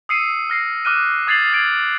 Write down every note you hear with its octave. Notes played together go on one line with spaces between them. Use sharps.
D#6 E6 C7 C#7 D#7
F6 A#6 C7
D6 F6 F#6 D#7
D#6 G#6 A6 C7 F7 F#7
G#6 D7 F#7